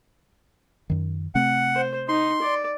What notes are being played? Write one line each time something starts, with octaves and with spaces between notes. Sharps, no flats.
F#2 D#3
C3 A3 C4 F#5
C5
D#4 C6
D5